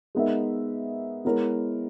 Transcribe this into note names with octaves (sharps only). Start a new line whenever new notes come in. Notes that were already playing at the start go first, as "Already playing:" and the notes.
G#3 B3 D#4 A#4 E5
G#3 B3 E4 A#4 C#5